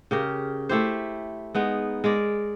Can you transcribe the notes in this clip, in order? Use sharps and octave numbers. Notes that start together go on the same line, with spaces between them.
C#3 G4 A#4
A3 E4 G4 C5
G#3 B3 D#4
G#3 A#4 D5